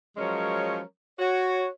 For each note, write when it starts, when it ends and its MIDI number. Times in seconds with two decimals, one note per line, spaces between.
0.17 0.81 53
0.17 0.81 54
0.17 0.81 56
0.17 0.81 61
0.17 0.81 70
0.17 0.81 73
1.19 1.67 66
1.19 1.67 73